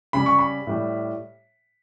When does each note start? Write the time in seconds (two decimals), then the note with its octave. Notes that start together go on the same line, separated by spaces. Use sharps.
0.13 C#3 G3 B5
0.26 C#6
0.39 B5
0.67 A2 G3